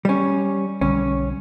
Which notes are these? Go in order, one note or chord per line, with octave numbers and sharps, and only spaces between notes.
G3 C#4
B1 D3 G3 C#4